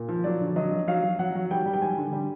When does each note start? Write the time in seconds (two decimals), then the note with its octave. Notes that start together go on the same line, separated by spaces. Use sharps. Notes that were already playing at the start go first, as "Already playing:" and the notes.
Already playing: A#2
0.09 F3
0.24 F#3 D5
0.41 D3
0.56 F#3 D#5
0.71 F#3
0.88 F#3 F5
1.03 F#3
1.19 F#3 F#5
1.35 F#3
1.51 G3 G5
1.66 G3
1.74 G5
1.82 G3 G#5
1.98 D3
2.13 G3